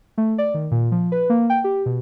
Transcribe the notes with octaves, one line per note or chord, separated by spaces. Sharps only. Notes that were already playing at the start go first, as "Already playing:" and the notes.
A3
D5
D#3
A#2
F3
B4
A#3
G5
G4
B2